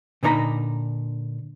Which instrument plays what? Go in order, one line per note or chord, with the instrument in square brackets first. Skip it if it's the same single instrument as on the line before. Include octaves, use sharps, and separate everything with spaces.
[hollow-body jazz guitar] A#2 D3 D#4 C#5 A#5 B5